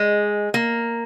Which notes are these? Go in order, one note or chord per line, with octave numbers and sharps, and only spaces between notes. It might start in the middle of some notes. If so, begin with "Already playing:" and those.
Already playing: G#3
A#3